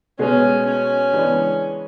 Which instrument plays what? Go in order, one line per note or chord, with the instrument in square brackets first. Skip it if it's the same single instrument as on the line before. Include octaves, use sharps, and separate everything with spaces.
[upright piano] B2 G#3 B3 [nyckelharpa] C#4
[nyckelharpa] C#4
[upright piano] C#3 E3 G#3 B3 D4